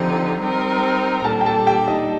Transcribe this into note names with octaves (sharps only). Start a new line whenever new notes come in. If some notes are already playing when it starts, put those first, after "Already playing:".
Already playing: D3 F3 C4 D#4 G4
G3 C4 D#4 A#4
A#5
A#2 G3 D4 A4 A5
G5
A4 A5
G4 G5
D#4 D#5